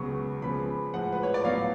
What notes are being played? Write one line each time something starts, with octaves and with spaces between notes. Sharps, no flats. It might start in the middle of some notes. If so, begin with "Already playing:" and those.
Already playing: C#2 C#3 F#3 B3 C#6
C#2 C#3 F3 B3 B5
A2 F3 G#3 F#5
B4
C#5
D5
A2 F#3 B3 F5